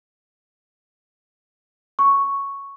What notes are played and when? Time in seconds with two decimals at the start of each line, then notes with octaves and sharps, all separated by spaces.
1.99 C#6